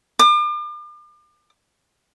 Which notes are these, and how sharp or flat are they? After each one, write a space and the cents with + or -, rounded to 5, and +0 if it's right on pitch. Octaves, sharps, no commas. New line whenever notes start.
D6 +40